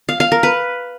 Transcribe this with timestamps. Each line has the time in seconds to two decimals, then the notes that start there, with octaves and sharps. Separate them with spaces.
0.09 F5
0.20 F5
0.32 A#4
0.43 B4